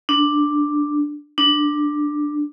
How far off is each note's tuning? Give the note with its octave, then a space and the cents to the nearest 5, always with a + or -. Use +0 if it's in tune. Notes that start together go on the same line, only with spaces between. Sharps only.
D4 +5
D4 +10